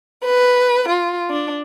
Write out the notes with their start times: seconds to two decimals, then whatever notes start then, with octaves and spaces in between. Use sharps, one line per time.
0.24 B4
0.87 F4
1.29 D4